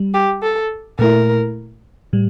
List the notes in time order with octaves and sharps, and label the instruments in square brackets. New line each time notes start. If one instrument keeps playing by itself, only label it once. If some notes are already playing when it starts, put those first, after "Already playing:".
Already playing: [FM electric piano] G3
[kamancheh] G4
A4
[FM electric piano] A#2 A3 E4 [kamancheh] A#4
[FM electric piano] A2 G3